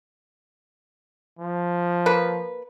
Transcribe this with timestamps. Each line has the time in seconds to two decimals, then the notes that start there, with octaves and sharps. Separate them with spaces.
1.39 F3
2.06 A#3 B4